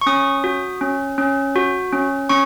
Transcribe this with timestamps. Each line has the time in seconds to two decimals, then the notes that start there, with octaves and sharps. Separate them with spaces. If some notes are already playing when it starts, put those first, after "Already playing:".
0.01 C#6
0.06 C#4 D#6
0.44 F#4
0.81 C#4
1.18 C#4
1.56 F#4
1.92 C#4
2.29 C#4 C#6